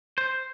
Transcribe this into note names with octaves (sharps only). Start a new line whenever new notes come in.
C5